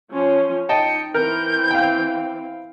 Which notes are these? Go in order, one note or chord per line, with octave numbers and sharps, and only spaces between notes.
F3 C#4 C#5 C6
D#4 D#5 G5 A5 C#7
E3 C4 A#4 G6
F5 G5